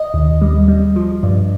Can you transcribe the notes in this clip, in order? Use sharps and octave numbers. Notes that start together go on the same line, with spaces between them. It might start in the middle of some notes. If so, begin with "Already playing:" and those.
Already playing: D#5
D#2
G3
G3
F3
G2